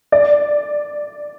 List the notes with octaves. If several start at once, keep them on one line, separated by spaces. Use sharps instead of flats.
D5